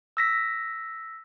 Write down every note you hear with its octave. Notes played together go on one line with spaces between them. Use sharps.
E6 A#6 B6